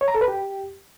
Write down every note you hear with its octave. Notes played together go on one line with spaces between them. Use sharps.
C#5
A#5
A4
B4
G4